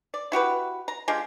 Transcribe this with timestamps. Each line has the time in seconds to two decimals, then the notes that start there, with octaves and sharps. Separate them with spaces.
0.14 D5
0.32 E4 F#4 G4 B4
0.88 A#5
1.08 G#3 D4 F4 G4